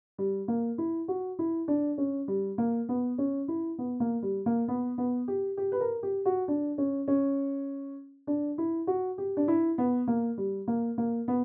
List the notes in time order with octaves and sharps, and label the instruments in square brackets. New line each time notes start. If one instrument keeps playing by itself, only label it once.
[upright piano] G3
A#3
E4
F#4
E4
D4
C#4
G3
A#3
B3
C#4
E4
B3
A#3
G3
A#3
B3
B3
G4
G4
B4
A#4
G4
F#4
D4
C#4
C#4
D4
E4
F#4
G4
D4
E4
B3
A#3
G3
A#3
A#3
B3